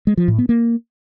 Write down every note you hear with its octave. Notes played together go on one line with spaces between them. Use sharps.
G#3
F3
A2
B3
A#3